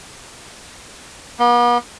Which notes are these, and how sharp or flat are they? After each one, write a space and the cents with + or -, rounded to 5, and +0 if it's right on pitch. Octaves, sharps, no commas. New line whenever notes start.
B3 -45